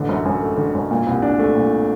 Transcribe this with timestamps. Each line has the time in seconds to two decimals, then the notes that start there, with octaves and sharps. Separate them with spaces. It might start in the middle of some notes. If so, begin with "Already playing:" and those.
Already playing: A1 D3
0.09 F#2
0.25 F#2
0.42 A3
0.57 D3
0.74 F#2
0.91 A#2
1.07 C2
1.22 D4
1.39 A3
1.56 A#2